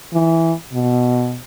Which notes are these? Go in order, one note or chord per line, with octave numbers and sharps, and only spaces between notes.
E3
B2